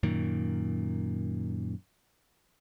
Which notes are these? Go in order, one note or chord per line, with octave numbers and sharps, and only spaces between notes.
F#2 A#2 D#3